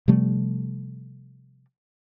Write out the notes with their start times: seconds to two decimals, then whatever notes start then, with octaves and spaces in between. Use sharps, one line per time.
0.08 C3 F3 G3 A3